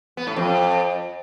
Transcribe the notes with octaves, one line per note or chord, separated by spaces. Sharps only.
B3
A2
F2